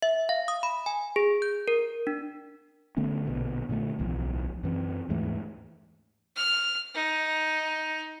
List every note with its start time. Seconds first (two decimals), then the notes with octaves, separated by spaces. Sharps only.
0.02 E5
0.29 F5
0.48 D#6
0.63 B5
0.86 G#5
1.16 G#4
1.42 G6
1.68 A#4
2.07 D4
2.97 D3 A3 B3 C#4
3.25 A#1 B2 D3
3.69 A#2 D3 D#3 A3
3.99 D1 B1 E3 F3
4.63 F#2 E3 C4
5.09 D#2 G#2 E3 A3
6.36 F6
6.94 D#4